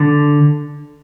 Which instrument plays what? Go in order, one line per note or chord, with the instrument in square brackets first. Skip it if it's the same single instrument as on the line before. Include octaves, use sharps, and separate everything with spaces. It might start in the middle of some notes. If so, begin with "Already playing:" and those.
Already playing: [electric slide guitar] D3